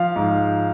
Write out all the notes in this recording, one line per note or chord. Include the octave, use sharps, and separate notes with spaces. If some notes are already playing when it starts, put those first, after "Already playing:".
Already playing: F3 F5
G#2